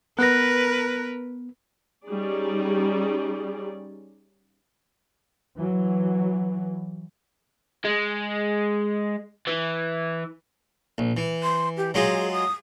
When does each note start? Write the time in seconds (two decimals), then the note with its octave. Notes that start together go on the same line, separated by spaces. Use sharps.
0.19 B3 A#4 B4 F#6 A#6
2.06 G3 C#4 D#4 G#4 D5
5.57 E3 F#3
7.85 G#3
9.47 E3
10.98 A#1
11.17 E3
11.43 C6
11.77 G4
11.94 F#3 G#3 F4 G#4
12.33 D#6